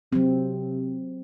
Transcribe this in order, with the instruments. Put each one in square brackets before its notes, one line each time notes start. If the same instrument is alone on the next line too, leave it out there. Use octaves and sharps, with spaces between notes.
[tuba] C3 [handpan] F#3 C4